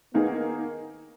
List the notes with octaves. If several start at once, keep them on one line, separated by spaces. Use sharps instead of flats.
D#3 A#3 B3 D#4 G#4